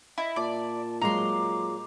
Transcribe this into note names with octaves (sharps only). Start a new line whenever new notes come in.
E4 D#5
A#2 D5 A5
F#3 G#3 F4 A#5 C6 D6